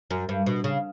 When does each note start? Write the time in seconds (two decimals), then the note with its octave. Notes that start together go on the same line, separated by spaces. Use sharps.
0.11 F#2
0.29 G2
0.46 B2
0.64 C#3